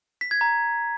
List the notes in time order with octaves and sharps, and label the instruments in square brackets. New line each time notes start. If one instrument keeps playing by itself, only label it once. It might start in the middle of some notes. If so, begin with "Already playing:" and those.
[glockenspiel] B6
G#6
A#5